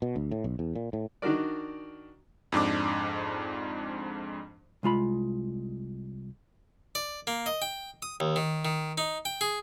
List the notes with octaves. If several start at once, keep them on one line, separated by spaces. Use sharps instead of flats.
B2
D2
A2
B1
E2
A#2
A2
D#3 D4 F#4 A#4 D5
F2 G#2 D4 D6
C2 G#3 F4 B5
D5
A#3
D#5
G5
D#6
D#2
D#3
D#3
D#4
G5
G#4